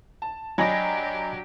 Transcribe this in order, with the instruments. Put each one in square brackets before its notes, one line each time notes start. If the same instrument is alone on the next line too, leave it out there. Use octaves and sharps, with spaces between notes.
[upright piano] A5
[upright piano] F#3 A#6 [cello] D4 G4 [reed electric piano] D#5 G#5 B5